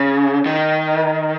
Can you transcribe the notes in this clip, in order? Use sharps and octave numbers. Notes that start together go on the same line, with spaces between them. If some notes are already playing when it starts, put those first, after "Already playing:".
Already playing: C#3
D#3